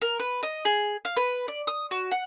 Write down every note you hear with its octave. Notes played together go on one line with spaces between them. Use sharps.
A#4
B4
D#5
G#4
F5
B4
D5
D#6
F#4
F#5